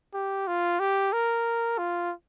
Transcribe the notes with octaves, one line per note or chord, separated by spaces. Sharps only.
G4
F4
G4
A#4
F4